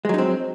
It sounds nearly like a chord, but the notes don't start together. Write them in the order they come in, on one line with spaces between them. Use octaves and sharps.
G#3 F#3 D#4 C4